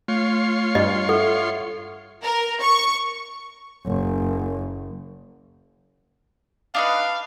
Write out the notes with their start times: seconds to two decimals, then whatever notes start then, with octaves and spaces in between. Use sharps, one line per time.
0.08 A3 F4 C#5 C6
0.75 G2 D#5
1.09 A4 E5 F#5
2.23 A#4
2.60 C#6
3.86 F#1
6.75 D4 D#4 B4 F5